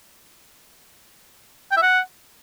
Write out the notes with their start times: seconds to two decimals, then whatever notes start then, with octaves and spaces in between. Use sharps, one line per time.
1.72 G5
1.77 E5
1.82 F#5